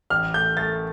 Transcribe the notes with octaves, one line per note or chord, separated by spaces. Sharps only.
A1 F6
A3 G6
A3 A6